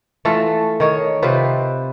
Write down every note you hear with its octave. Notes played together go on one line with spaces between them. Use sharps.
E3 A3 F4 A4
D#3 C#5
C3 C4 F4 B4